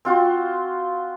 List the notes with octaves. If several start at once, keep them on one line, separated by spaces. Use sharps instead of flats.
C4 F4 F#4